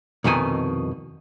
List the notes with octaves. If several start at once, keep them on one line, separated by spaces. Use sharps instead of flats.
C2 F2 B2 D#3 G#5